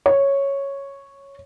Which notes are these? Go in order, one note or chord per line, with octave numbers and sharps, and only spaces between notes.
C#5